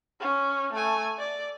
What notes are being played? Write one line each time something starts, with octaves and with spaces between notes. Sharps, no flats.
C#4
A3 G#5
D5